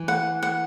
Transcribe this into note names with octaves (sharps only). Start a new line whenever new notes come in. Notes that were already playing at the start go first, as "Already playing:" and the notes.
Already playing: E3
F#5
F#5